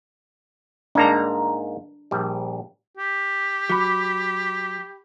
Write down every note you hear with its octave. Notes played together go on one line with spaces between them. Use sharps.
G#2 A#3 D4 D#4 A#5
A#1 G3
G4
F#3 B5 D6